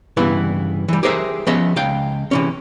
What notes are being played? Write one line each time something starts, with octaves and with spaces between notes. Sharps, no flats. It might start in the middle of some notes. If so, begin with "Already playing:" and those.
G2 C#3 E3 B3 E4
E3 G3
G4 G#4 A#4 C5 D5 E5
F3 B3 C#4 G#4 D#5 E5
C#2 F5 G5
C3 E3 C#4